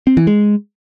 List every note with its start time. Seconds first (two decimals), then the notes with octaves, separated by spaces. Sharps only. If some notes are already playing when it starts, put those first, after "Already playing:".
0.07 C4
0.17 E3
0.27 G#3